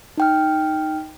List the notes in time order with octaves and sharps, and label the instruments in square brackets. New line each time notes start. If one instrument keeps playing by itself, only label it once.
[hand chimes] D#4 G5 F6